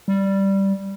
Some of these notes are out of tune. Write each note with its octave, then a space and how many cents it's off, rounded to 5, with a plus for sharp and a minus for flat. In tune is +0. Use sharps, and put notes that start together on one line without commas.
G3 -5